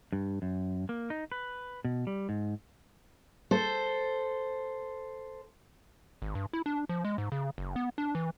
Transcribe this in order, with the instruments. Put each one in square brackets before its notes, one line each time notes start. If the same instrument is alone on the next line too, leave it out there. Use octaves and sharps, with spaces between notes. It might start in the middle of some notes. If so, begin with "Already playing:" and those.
[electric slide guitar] G2
F#2
A#3
D#4
B4
B2
G3
G#2
[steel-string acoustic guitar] A4 C5
[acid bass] G#1
G2
E4
D4
F3
G#3
G#2
C#3
F#1
B3
D4
E3